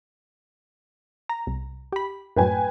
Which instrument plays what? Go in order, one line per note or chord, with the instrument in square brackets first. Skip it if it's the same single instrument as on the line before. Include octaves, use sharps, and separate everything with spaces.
[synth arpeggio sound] A#5
C2
G4 B5
[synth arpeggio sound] F#2 A2 F#3 [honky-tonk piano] B4 G5 G#5